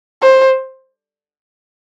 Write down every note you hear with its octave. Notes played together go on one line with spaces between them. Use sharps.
C5